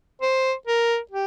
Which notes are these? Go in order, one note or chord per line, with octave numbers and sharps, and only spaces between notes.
C5
A#4
G4